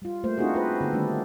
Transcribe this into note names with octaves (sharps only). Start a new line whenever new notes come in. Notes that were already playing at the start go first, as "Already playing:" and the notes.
G3 F4
A3 A#3 C5
C4 D4 D#4 F4 F#4 G#4
F4 B4 C5
D3 B3 A4
D#3 G3 A3 D4